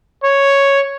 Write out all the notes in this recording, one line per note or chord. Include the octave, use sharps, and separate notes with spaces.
C#5